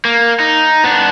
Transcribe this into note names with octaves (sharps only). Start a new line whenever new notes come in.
A#3
D#4
B3 D4